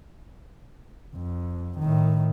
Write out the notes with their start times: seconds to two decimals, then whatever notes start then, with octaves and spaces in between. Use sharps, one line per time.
1.16 F2
1.79 A2 D#3